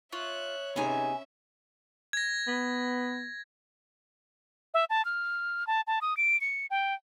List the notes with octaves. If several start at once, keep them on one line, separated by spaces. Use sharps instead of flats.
F4 C#5 E5 F#6
C3 B3 C#4 D#4 G#4 E5 G#5
G#6 A#6
B3
E5
A5
F6
A5
A5
D#6
D7
C#7
G5